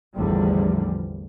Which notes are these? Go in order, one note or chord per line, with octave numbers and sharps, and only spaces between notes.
A1 E2 D3 F3 G3